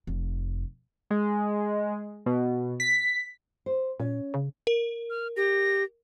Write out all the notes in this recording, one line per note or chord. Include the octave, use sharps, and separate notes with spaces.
F1
G#3
B2
B6
C5
A#2 C#4
C#3
A#4
F6
G4 A#6